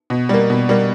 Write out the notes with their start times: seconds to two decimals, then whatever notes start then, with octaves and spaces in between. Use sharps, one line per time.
0.10 B2
0.29 G3 A#3
0.50 B2
0.69 G3 A#3